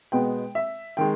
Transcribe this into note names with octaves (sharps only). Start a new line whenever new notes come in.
B2 G#3 B3 G5
E5
D#3 G#3 G5